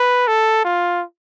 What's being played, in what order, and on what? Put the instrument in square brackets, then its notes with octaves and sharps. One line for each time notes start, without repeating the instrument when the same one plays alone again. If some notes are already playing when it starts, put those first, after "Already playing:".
Already playing: [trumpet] B4
A4
F4